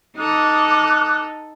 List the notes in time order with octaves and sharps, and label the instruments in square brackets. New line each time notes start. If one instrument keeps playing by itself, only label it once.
[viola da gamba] D#4 A4 [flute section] D6 D#6 F#6